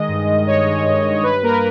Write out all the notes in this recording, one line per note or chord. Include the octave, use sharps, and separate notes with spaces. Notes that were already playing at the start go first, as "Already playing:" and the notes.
Already playing: D#3 G#3 D#5
G2
D#3
G#3 C#5
G#3
G2
G2
G2 B4
A#3 A#4